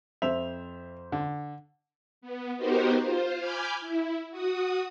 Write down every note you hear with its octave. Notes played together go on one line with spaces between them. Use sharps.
F2 C5 E5 F7
D3
B3
B3 D#4 F#4 G4 A#4 C5
F4 C5
G#5 B5 D6 F6 G6 G#6
E4
F#4 D#6